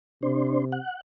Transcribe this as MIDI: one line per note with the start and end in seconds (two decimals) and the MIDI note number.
0.23 0.78 48
0.23 0.65 62
0.23 0.65 72
0.72 1.01 78